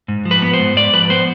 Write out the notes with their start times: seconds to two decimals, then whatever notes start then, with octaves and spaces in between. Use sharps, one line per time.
0.08 G#2
0.25 F3
0.31 B4
0.42 B3
0.53 C5
0.59 G#2
0.76 G#2 D5
0.93 F3 B4
1.10 B3 C5